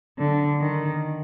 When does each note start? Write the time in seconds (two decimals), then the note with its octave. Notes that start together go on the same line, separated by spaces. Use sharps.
0.18 D3
0.60 D#3